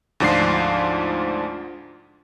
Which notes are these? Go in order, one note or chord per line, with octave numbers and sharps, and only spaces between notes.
D2 G#2 F3 D4 F4 C7